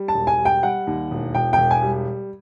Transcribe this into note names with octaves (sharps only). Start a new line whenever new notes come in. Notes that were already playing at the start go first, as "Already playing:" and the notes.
Already playing: G3
A5
E1
G#5
G3
G5
G3 F#5
D#2
E1
E1 G5
E1 G5
G#5
G3